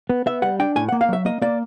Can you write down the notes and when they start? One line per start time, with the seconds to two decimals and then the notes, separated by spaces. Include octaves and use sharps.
0.10 B3
0.26 B3 E5
0.42 G3 F#5
0.60 D4 G5
0.76 A2 G#5
0.89 A#3 F#5
1.01 F5
1.09 F#3 E5
1.25 A#3 D#5
1.42 A#3 D5